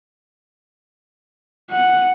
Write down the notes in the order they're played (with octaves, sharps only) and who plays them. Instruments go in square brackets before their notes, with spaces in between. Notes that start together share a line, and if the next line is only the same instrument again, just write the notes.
[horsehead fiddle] F#5